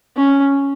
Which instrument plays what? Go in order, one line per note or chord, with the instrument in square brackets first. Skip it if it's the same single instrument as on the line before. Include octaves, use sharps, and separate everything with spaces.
[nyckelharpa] C#4